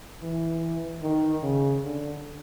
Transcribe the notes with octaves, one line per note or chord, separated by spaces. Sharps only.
E3
D#3
C#3
D3